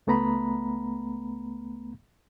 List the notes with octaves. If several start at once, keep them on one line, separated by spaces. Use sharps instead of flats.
C#2 A3 B3 A#5 B5